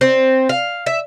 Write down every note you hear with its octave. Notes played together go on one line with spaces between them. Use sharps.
C4
F5
E5